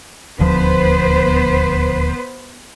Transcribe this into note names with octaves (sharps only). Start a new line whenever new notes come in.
D#1 D2 F3 B3 B4 C5